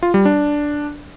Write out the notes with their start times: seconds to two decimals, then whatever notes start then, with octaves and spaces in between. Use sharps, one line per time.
0.03 F4
0.14 G3
0.25 D4